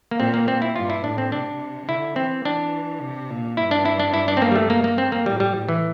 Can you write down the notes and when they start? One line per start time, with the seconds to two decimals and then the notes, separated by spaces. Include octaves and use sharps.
0.11 A#3
0.19 A#2 C4
0.34 A#3
0.48 C4
0.62 E4
0.76 G2 F4
0.90 E4
1.04 A2 D4
1.18 C4
1.32 C3 D4
1.89 D3 E4
2.16 E3 C4
2.45 E3 D4
3.00 C3
3.30 A#2
3.57 G2 E4
3.71 D4
3.85 E4
4.00 D4
4.14 E4
4.28 D4
4.37 C4
4.42 A#3
4.52 G3
4.56 A3
4.70 A#3
4.84 A#3
4.98 C4
5.12 A#3
5.26 A2 G3
5.40 G3
5.54 A2
5.69 E3